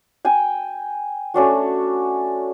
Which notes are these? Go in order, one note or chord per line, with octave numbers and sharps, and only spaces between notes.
G5 G#5
A3 C#4 D4 F#4